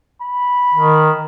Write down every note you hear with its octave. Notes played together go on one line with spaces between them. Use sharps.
B5
D#3